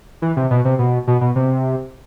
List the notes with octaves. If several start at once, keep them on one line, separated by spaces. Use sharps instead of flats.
E3
C3
B2
C3
B2
B2
B2
C3